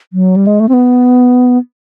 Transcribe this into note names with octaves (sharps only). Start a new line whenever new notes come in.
F#3
G3
G#3
A3
C4
B3